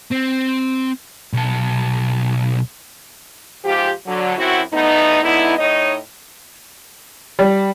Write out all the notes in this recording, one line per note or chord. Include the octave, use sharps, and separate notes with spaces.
C4
B1 A4
G#2 F3 F4 G4
D3 F#3
F#2 C4 E4 F#4
E2 A3 B3 D#4
D3 G#3 B3 D#4 E4
A2 D#4 C#5 D#5
G3